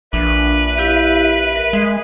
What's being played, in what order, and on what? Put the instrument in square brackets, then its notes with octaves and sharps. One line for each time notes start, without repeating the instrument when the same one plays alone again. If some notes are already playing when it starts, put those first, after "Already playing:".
[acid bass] A#1 [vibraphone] D4 [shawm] B4 [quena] E5
[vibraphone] E4 G4 F5
A#4
[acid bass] G#3